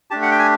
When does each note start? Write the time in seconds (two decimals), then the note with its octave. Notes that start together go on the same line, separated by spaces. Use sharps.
0.11 A3 D4 G4 A5
0.23 F#5
0.31 G5
0.39 G#5